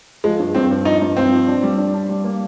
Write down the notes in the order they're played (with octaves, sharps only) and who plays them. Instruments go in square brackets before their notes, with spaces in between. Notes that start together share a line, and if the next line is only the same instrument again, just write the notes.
[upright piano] F3 [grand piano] G#3
[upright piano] G2
[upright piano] G2 [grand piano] C4
[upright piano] G2
[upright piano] F3 [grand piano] D#4
[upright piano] G2
[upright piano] G2 [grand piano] C4
[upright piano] F3
D4
G3
D4
D4
G3
A#3